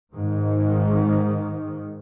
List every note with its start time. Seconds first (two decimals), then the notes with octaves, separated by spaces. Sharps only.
0.12 G#2 D#3